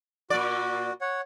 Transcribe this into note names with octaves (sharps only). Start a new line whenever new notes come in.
A#2 F#4 D5
C#5 F#5